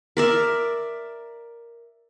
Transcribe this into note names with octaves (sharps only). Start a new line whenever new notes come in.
A#4 D5 E5